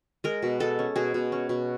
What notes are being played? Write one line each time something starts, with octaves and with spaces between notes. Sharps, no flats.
G#3 A#4
B2
G#3 A4
C#4
B2 G#4
B2
C#4
B2